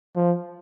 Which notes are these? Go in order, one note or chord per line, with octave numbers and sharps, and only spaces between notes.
F3